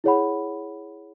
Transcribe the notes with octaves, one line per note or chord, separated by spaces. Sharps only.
E4 G#4 C#5 F#5 B5